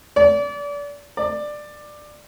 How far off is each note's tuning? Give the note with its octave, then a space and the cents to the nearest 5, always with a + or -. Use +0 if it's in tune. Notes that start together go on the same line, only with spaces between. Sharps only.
D5 -30
D5 +15